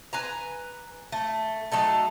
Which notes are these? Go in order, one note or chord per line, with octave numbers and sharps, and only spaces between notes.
B4 G#5 A#5
A3
F#3 A3 D#4 A4